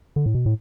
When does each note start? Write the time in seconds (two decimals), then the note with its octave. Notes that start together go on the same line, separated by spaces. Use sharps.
0.16 D3
0.26 A2
0.35 B2
0.46 A2